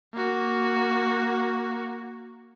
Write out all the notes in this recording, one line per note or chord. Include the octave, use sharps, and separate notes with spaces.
A#3 F#4